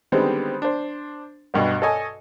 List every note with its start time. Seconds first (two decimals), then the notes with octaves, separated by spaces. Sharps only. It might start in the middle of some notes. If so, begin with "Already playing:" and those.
0.12 D3 D#3 G3 G#3 B3 C4
0.62 D4 C5
1.54 B1 G2 B2
1.82 A4 C#5 D#5 G#5